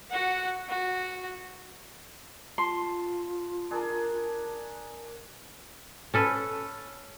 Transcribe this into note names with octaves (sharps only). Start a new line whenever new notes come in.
F#4 F#5
F#4
F4 A5 C6
D4 G#4 A#4
C#4 A4 B4